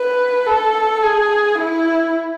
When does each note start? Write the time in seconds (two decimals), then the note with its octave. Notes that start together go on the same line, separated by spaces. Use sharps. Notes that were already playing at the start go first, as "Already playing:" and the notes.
Already playing: B4
0.47 A4
1.02 G#4
1.58 E4